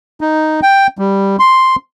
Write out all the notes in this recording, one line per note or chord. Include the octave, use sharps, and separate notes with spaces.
D#4
G5
G3
C6